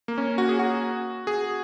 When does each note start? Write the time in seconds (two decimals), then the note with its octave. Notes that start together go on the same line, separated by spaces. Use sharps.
0.08 A#3
0.18 C#4
0.38 F#4
0.49 G#4
0.59 F#4
1.27 G#4